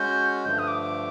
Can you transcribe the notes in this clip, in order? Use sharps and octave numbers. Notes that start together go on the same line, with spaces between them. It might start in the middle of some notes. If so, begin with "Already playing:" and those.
Already playing: G#3 C#4 F#4 G6
G2 D3 F3 A3 G6
D#6
D6